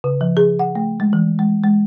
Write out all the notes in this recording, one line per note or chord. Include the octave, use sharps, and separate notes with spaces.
C#3
F3
G#4
F#5
A3
G#3
E3
G#3
G#3